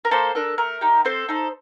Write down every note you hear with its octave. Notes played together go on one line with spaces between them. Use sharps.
A#4
A#3 A4 C5
D4 A4 A#4
A3 A#4
D#4 G4
C4 A4 C5
D#4 A4